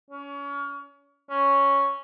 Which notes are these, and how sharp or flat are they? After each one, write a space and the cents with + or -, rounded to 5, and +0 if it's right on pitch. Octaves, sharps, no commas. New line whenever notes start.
C#4 +30
C#4 +0